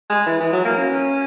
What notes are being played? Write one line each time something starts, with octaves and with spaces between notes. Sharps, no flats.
G#3
E3
E3
F#3
A#3
C#4